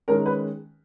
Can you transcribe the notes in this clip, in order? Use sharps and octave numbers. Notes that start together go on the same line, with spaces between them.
D#3 G#3 C#4 A#4
B4